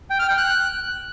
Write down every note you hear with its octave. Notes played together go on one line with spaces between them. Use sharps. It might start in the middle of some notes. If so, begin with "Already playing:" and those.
G5
F6
G5
F#6